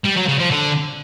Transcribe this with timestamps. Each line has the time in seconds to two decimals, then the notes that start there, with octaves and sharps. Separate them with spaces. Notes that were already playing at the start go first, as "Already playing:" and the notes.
0.05 G3
0.17 F#3
0.28 C#3
0.39 F3
0.51 D3